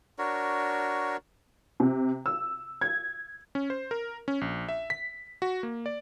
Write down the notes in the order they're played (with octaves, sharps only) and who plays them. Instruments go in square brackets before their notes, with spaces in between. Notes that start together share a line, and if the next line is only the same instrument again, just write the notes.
[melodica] D4 F#4 A#4 C#5
[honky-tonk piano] C3
E6
G#6
[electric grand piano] C#4
C5
A#4
C#4
A#1
E5
B6
F#4
A#3
D5